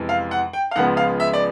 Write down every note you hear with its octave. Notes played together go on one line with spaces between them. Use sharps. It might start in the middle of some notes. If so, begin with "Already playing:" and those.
Already playing: F2 C3 E3 G#3 B3
F5
F#5
G5
F5
C#2 C#3 F3 G#3 B3 F#5
F5
E5
D5